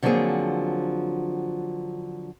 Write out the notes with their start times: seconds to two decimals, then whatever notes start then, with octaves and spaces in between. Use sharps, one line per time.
0.03 D3 F3 F#3 A#3 C4 G#4